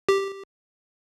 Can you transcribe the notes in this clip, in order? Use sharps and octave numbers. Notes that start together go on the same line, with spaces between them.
G4